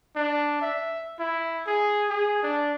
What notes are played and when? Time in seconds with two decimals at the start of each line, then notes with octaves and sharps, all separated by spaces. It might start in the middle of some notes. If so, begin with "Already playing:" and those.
0.16 D4
0.62 E5
1.19 E4
1.67 G#4
2.10 G#4
2.43 D4